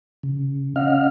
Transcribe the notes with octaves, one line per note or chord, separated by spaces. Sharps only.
C#3
C#4 D#5 F5 F#5 F6